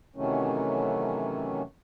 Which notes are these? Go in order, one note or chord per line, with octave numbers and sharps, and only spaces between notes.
C3 D#3 E3 F#3 A3 C#4